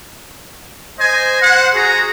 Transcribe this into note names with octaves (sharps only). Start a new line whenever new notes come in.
C5 D#5 G#5
C5 F#5
F#4 G#4 A#5